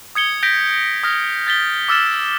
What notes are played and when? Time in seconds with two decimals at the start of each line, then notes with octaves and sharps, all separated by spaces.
0.15 D#6 G#6 C#7 G7
0.43 G6 A#6 B6 D7 G7
1.03 D#6 F6 A#6
1.47 G6 A6 B6 G7
1.88 D6 E6 F6 A6 E7